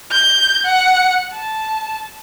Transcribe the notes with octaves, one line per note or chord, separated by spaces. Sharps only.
G6
F#5
A5